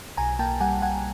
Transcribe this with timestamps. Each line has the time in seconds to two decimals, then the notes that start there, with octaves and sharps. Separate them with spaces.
0.17 B1 G#5 A#5
0.39 A#3 G5 A5
0.60 G3 F#5 G#5
0.82 G3 F#5 G#5